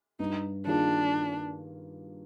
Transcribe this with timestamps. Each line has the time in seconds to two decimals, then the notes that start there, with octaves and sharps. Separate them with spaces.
0.20 G2 D#4
0.67 D#3 A#3 D4 F4 G#4